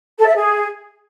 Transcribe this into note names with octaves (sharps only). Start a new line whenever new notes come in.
A4
E5
G#4